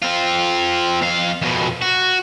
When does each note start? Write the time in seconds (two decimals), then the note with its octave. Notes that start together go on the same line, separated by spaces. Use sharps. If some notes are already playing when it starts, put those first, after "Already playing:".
0.03 C4 F4
1.02 F2 F5
1.42 F2 B2
1.82 F#4